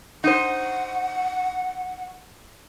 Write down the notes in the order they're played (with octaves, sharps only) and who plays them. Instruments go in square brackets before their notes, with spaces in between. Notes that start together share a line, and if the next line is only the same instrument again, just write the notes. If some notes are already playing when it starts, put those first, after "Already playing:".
[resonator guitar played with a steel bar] D#4 C5 [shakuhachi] F#5